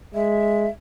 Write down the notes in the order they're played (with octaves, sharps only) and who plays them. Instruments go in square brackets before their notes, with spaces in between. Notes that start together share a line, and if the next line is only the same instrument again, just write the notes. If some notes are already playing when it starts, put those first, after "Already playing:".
[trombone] G#3 [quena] E5